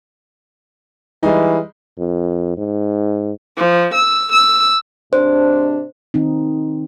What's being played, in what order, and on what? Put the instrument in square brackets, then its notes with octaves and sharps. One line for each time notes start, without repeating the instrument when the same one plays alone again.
[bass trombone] E3 [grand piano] G3 G#3 D#4
[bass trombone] F2
G#2
[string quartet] F3
E6
E6
[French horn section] G#2 C3 D4 [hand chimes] C5
[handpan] D#3 C4 D#4